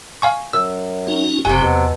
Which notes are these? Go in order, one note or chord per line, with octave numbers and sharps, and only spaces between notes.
F5 G#5 C#6
F#2 E6
C#4 D#4 F#4
F#1 F#2 C3 F#3 G4 G#5
E2 B2